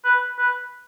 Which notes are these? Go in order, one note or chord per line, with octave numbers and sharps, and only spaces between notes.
B4
B4